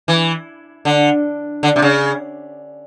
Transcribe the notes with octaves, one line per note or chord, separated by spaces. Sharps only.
E3
D3
D3
C3
C#3